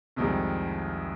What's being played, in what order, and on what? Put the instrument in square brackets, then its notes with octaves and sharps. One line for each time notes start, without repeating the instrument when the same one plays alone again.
[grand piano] C2 F2 D#3 G3 G#3